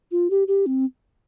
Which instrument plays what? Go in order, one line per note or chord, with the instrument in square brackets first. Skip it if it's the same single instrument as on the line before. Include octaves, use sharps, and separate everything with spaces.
[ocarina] F4
G4
G4
C4